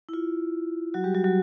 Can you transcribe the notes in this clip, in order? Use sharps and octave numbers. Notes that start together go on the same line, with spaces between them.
E4
F4
F#3 F#4
G3 G4
F#3 F#4
F#3 F#4